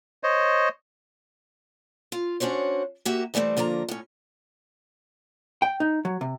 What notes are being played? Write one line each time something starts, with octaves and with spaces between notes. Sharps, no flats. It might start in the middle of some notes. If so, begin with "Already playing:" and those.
C5 C#5 D#5
F4
C#4 D4 F#4 C5 C#5
A#3 F#4 G4 E5
E3 G3 A3 A#3 C4
D3 F3 A#3 A5 A#5
A2 C#4
G5
D#4
F#3
C3